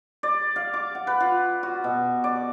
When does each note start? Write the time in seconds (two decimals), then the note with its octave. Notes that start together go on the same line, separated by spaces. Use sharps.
0.23 D5
0.56 F5
0.74 D6
0.95 F#5
1.07 B4
1.20 F4
1.63 F#4
1.84 B2
2.24 D5